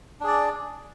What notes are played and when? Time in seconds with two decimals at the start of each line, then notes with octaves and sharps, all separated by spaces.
0.20 D4
0.24 G#4
0.27 D5